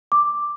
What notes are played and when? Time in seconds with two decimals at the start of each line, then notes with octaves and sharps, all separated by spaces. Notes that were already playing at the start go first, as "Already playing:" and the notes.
0.12 D6